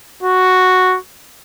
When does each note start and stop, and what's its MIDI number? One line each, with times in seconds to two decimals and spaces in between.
0.23 0.97 66